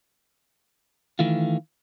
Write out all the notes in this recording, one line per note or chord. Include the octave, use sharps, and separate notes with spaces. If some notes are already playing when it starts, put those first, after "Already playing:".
D#3 E3 A3 F4